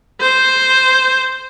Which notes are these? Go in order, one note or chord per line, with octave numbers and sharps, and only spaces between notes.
C5